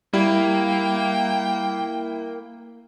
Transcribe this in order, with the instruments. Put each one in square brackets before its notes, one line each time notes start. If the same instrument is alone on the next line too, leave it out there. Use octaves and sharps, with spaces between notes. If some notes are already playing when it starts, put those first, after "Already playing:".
[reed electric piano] G3 [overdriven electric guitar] A#3 [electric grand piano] E4 [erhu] G5